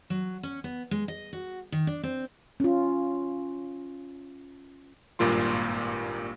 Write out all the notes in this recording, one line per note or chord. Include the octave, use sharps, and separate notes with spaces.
F#3
C#4
B3
G#3
D#5
F#4
D#3
D4
C4
C#4 F4
G#1 G2 A#2 A#3 F4 C6